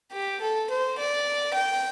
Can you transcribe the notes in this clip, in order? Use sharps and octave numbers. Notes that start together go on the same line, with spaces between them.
G4
A4
C5
D5
G5